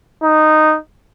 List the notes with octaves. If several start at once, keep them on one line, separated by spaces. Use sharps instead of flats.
D#4